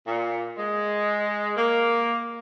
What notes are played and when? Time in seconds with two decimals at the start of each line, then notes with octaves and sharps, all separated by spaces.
0.07 A#2
0.58 G#3
1.57 A#3